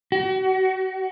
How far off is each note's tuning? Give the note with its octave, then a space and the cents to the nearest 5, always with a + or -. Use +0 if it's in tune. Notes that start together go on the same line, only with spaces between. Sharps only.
F#4 +35